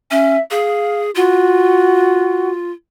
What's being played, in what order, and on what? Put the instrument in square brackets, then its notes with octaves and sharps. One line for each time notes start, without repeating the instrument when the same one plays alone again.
[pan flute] C#4 [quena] E5
[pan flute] G#4 [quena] F5
[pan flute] F4 [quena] F#4